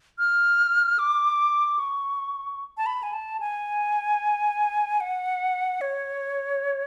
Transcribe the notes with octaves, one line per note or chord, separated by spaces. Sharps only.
F6
D6
C#6
A5
B5
G#5
A5
G#5
F#5
C#5